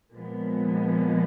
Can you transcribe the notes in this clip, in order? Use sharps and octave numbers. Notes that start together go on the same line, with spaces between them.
A#2 F3 G#3 B3